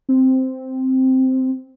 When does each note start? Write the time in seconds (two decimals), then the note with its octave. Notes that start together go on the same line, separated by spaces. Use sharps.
0.09 C4